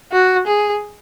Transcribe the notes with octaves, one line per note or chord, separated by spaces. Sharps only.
F#4
G#4